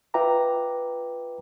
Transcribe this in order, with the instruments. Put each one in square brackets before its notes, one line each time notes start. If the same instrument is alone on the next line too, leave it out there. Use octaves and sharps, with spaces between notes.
[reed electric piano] F4 B4 E5 G5 A#5 D6